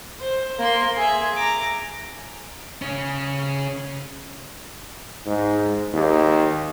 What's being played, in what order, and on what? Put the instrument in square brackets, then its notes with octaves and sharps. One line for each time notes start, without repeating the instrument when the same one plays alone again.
[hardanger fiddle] C5
A#3 C6
G#4 E5
A#5 D6
[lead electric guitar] C#3 C#4
[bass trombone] G#2
D#2